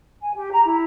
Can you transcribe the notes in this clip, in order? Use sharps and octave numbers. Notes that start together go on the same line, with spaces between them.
G#5
G4
A#5
E4